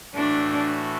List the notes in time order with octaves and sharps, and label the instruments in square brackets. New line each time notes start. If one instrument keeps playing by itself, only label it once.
[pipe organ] A2 E3 A3 F#4 [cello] D4